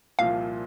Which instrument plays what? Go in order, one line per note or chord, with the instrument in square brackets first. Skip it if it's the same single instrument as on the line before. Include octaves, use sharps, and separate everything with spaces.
[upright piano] C2 A#2 F3 C4 F4 [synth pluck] F5